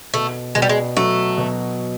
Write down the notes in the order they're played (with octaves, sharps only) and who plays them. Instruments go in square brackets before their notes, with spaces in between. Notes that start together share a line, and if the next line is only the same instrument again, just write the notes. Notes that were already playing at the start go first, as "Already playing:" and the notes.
[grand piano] B2 [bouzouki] A3
[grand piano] B2 [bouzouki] G#3
[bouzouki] G3
G#3
[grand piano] F#3 [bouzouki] A3
[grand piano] B2